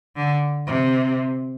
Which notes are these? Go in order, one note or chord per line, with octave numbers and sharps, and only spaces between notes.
D3
C3